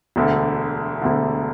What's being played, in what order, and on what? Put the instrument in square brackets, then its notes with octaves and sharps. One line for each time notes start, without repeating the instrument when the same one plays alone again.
[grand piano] E1 D2 D3
E1 D2 D3